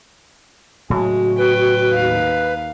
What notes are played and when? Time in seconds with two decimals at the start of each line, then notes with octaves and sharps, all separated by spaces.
0.90 A2 C#3 F#3 G#3 F#4
1.38 B4 G5
1.92 D#2 F5